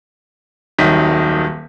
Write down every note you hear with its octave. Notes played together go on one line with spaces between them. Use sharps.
D#1 C2 D#3 F#3 B6